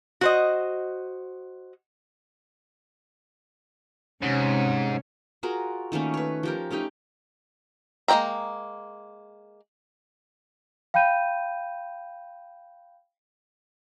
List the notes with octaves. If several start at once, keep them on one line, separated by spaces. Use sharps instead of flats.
F#4 C5 D#5
G#2 C3 C#4
F4 F#4 G#4 A#4
D#3 A3 A#3 C#4
B4 C#5
F3 G4 A#4
A3 C#4 D#4 G4
G#3 A#3 D5 G5 A#5
F5 G5 B5 G6 D#7